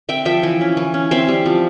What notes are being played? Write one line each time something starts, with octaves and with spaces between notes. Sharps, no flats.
C4 E5 G5
F3 E5 G5
E3
C#4
E3
C#4
C4 C5 E5
G3
F3